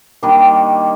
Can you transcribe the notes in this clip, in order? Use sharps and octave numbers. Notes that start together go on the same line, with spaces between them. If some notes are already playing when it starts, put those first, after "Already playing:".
D#3 G3 A#3 D4